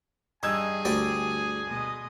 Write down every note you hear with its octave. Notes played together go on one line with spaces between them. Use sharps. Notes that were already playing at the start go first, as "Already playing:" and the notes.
G2 D#4 G#4 G#5 E6 G#6
D2 G4 D5
B2 G#3 D#5